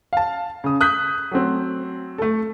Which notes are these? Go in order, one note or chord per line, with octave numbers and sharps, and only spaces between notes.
F5 A5
C#3 D#6
D#6 F#6 G6 B6
F#3 A3 C4
A3 A4